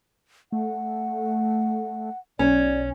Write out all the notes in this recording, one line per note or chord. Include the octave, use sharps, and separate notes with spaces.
A3 F#5
B1 C#4 D5